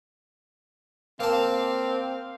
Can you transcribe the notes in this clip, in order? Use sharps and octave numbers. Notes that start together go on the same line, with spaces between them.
A#3 C4 F5 A5